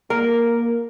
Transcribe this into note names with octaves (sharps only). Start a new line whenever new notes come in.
A#3 A#4